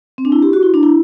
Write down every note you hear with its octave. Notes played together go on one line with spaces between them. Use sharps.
C4
D4
E4
G4
F#4
E4
D4
E4